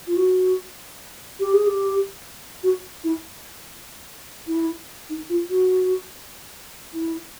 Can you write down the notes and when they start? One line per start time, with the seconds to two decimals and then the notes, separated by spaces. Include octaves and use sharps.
0.07 F4
0.16 F#4
1.40 G4
1.53 G#4
1.67 G4
2.63 F#4
3.04 E4
4.47 E4
5.10 D#4
5.29 F4
5.50 F#4
6.94 E4